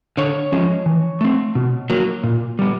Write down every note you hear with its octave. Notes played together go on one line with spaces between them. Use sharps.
D3 C#5
F3 G#3 C#4
E3
A3 C4
B2
F#3 A#3
A#2
G3 B3